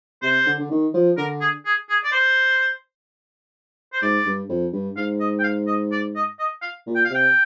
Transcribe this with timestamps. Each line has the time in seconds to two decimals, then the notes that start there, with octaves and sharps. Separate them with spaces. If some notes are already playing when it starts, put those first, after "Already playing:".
0.22 C3 C5
0.46 D3
0.59 D3
0.70 D#3
0.93 F3
1.17 D3 A#4
1.41 G#4
1.65 G#4
1.89 G#4
2.04 D5
2.12 C5
3.93 C5
4.02 G#2 D5
4.25 G2
4.49 F2
4.72 G2
4.97 G#2 F5
5.20 D#5
5.39 G5
5.44 F5
5.67 D#5
5.92 D5
6.15 D#5
6.39 D#5
6.62 F5
6.86 A#2
6.95 G5
7.04 F5
7.10 C3 G5